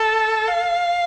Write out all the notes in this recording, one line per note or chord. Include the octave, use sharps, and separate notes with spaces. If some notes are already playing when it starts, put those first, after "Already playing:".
Already playing: A4
F5